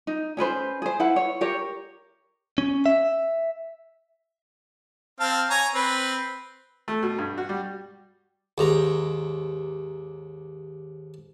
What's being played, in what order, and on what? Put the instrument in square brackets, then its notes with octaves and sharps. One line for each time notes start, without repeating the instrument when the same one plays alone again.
[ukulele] D#4
C#4 G#4 B4 C5
G#4 C5
E4 B4 F#5
C#5
G4 A#4 C#5
[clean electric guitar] C#4
E5
[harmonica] C4 F5 A5
C#5 G#5 A#5
C4 B4
[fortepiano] A3
B2
G2
F#4
G3
[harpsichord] D#2 G#2 A#5